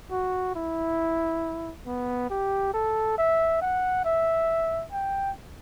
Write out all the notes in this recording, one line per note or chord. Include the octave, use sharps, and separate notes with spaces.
F#4
E4
B3
G4
A4
E5
F#5
E5
G5